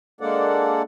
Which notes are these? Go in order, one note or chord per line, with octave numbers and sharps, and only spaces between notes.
G#3 A#3 D4 A4 D5 F#5